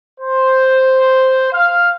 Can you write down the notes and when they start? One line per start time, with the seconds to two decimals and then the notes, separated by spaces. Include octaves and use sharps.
0.20 C5
1.52 F5